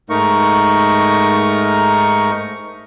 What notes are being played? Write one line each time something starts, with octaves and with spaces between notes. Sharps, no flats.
G#2 A3 D#4 A#4 C#6